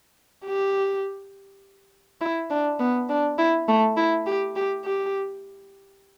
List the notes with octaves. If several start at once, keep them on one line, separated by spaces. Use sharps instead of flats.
G4
E4
D4
B3
D4
E4
A3
E4
G4
G4
G4